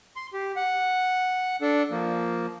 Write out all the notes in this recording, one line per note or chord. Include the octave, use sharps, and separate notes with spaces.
C6
G4
F#5
D4 A4
F3 A#3